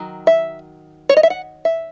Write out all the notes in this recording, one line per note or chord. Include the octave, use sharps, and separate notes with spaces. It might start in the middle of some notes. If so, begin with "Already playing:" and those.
Already playing: D#3 F#3
E5
C#5
D#5
E5
F#5
E5